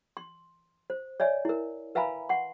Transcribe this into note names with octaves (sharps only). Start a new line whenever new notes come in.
C6
C5
C#5 D5 E5 G#5
E4 A#4
B4 E5 F5 G#5 A#5 B5
F#5 C6